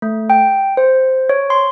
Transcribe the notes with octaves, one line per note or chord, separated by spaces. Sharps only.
A3
G5
C5
C#5
C6